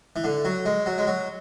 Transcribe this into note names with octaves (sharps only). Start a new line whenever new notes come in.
E3
D3
F#3
G#3
F#3
G#3
F#3